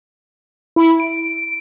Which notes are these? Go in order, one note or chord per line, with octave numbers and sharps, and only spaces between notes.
E4
D7